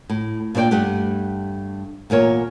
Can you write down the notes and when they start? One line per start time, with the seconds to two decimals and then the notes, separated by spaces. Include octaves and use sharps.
0.10 A2
0.55 A#2 D4 C5 D5 G5
0.71 G2 A3 G4 F#5
2.10 E2 A#2 A#4 C#5